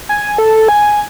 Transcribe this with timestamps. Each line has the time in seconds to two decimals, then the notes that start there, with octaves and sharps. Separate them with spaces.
0.09 G#5
0.38 A4
0.69 G#5